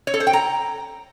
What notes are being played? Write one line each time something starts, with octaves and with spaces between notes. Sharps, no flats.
C#5
A4
C5
G5
A#5